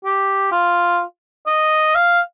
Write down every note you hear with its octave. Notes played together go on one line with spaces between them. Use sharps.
G4
F4
D#5
F5